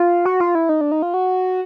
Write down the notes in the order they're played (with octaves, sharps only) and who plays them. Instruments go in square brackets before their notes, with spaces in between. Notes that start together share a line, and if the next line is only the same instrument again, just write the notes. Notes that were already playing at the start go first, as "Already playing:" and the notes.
Already playing: [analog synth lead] F4
F#4
F4
E4
D#4
D4
D#4
F4
F#4